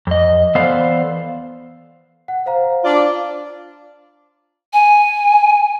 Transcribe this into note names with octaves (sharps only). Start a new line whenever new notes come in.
F2 D#5
E3 B3 A4 C5 D5 F5
F#5
C5 F5 A#5
D4 F4 D5
G#5